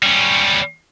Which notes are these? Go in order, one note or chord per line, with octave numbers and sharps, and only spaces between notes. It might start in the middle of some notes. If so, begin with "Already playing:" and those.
G3 C#4